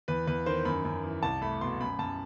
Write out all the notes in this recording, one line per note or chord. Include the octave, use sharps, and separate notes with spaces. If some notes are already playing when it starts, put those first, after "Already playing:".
E2 B4
E2 B4
D#3 C5
F#2 B5
F#2
E3
C2 A5
A3 B5
B2 C6
F#2 B5
F#2 A5